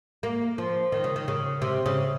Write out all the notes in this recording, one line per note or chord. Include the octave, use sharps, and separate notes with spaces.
A#3
F3
D#3
C#3
D#3
C#3
C3
C#3